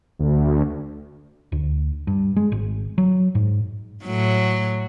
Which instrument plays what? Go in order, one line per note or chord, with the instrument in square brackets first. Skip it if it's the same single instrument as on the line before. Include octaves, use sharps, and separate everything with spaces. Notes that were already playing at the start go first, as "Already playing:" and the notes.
[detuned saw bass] D2
[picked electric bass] D2
G2
G#3
G#1
F#3
G#2
[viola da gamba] A2 F#3